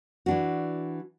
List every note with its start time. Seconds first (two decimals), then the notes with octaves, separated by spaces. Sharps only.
0.26 E3 D4 F#4